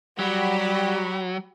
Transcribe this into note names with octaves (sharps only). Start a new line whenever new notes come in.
F#3 G3 F#4 G4 B5